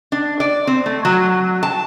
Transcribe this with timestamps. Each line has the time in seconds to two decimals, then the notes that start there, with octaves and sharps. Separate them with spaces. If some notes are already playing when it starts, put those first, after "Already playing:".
0.12 D4
0.40 D5
0.67 C4
0.86 A3
1.05 F#3
1.63 A5